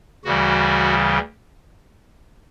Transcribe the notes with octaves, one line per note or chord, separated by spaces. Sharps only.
D2 C#3 E3 G3 F#4